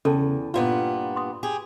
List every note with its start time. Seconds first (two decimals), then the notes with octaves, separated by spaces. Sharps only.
0.05 E2 C#3 A4 G5 A5
0.54 G2 A#2 B3 F4
1.16 C6 D#6
1.43 G4 G#4